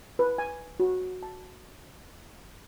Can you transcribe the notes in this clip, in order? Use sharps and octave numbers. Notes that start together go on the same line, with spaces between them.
B4
G#5
F#4
A5